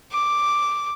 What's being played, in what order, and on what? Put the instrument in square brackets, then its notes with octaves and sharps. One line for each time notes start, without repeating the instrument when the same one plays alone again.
[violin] D6